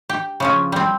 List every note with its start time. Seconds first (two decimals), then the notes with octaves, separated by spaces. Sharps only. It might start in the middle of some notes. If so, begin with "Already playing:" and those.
0.09 G4
0.40 C#3 F3 C#4
0.72 G3 C4